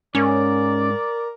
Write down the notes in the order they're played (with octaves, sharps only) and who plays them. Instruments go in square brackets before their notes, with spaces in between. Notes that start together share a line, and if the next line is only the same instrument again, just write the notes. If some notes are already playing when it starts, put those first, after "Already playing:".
[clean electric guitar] G#2 [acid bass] C#4 [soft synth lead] A#4 [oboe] D5